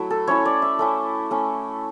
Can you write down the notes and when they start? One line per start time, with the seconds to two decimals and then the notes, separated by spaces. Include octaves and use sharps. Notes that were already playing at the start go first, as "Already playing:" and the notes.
Already playing: F#3 A3 E4
0.11 A4
0.27 A3 C#4 E4 C#5
0.45 D5
0.62 E5
0.79 A3 C#4 E4
1.31 A3 C#4 E4